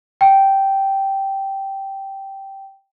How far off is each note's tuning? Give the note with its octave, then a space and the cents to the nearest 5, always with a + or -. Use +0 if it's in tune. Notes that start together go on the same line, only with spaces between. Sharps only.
G5 -10